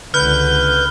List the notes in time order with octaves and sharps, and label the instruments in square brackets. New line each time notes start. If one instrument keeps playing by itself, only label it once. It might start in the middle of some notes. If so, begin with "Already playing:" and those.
[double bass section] C#2 D3 [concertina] B4 [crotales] F6 [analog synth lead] G6